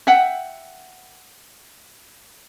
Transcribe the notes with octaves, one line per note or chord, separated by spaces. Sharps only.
E5 F#5 G5